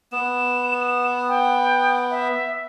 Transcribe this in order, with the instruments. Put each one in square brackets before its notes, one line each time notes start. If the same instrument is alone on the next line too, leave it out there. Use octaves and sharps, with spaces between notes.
[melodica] B3 [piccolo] E7
[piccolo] G5
E5